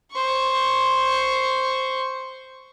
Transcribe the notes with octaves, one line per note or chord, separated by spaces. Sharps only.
C5 C#6